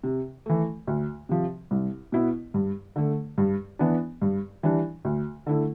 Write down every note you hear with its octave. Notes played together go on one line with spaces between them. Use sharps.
C3
E3 A3
D2
C3 F3
C2
B2 B3 E4
G2
D3 A3
G2
E3 B3 D4
G2
E3 G3 D4
D2
D3 A3 E4